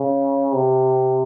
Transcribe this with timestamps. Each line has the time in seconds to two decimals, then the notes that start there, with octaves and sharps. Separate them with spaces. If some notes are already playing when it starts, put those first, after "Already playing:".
Already playing: C#3
0.54 C3